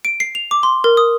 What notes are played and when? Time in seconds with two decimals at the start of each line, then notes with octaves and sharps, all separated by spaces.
0.05 D7
0.20 C7
0.35 F7
0.51 D6
0.63 C6
0.84 A#4
0.97 D#6